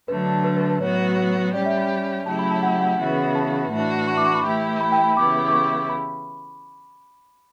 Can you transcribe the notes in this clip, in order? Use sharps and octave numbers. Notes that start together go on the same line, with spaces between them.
D3 F#3 A3 D4 B4
B4
B4
B4
A2 F#3 B3 F#4 C#5
G3 C#4 G4 D5
E5
B5
C#3 F#3 A3 E4 G4 A5
B5
A5
F#5
F#5
C#3 E3 B3 F#4
A5
A2 E3 A3 D4 F#4
C#6
D6
C#6
B5
E3 A3 E4 G4
B5
G5
B5
C#3 E3 B3 E4 G4 D6
D6
C#6
B5